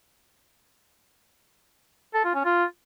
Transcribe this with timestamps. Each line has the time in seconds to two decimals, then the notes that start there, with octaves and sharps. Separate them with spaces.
2.14 A4
2.24 F4
2.35 C#4
2.45 F4